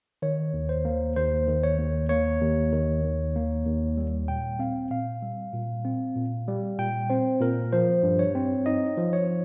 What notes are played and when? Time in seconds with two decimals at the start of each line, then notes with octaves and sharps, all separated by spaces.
0.22 D#3 C#5
0.53 D#2
0.69 C5
0.85 A#3
1.16 D#2 C5
1.48 D#3
1.63 C#5
1.79 D#2
2.09 A#3 C#5
2.41 D#2
2.72 D#3
3.04 D#2
3.35 A#3
3.66 D#2
3.97 G3
4.28 A#2 G5
4.59 C4 F5
4.91 A#2 F5
5.23 G3
5.53 A#2
5.85 C4
6.16 A#2
6.48 G3
6.79 A#2 G5
7.10 C4 C5
7.40 A#2 A#4
7.73 F3 C5
8.03 G2
8.19 C#5
8.35 C4
8.66 D#4 D#5
8.97 F3
9.13 C#5